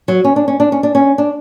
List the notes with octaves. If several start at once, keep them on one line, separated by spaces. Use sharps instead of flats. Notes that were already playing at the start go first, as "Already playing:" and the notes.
F#3
C#4
D4
C#4
D4
C#4
D4
C#4
D4